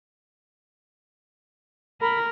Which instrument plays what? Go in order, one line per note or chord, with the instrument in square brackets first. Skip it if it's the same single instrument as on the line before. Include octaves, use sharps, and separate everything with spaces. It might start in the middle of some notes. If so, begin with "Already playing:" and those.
[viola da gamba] A#4 [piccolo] B5